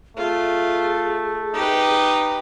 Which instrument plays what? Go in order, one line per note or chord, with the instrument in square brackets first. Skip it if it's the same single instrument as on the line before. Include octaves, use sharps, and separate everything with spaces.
[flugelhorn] A3 [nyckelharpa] F4 [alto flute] G#4
[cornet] D#4 [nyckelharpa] G4 B4